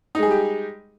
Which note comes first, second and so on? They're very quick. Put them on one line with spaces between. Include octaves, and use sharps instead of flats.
D#4 G#3 G#4 G3 G4